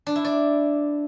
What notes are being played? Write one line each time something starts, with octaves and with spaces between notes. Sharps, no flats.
D4
E4
D5